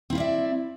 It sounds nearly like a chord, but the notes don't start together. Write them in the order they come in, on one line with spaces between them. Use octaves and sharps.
C4 E4 F5 D5 E5